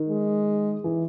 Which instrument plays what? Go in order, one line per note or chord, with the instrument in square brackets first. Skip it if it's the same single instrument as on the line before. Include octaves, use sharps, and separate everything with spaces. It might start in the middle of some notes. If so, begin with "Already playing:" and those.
Already playing: [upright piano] D#3
[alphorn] G#3
[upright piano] E3